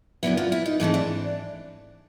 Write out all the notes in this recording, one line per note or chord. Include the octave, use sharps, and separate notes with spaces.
F#2 D3 F#3 B3 E4
F4
E4
D#4
G#2 E3 A3 C4 D#4
D4